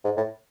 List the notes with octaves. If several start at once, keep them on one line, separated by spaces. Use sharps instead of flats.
G#2
A2